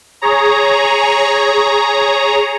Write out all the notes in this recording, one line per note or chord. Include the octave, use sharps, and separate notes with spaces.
G#4 C#5 A#5